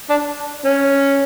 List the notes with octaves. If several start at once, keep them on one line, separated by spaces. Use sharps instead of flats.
D4
C#4